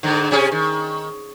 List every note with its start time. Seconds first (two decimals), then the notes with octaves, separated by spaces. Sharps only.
0.03 G#2 D3
0.31 C3 C#4 G#4
0.52 D#3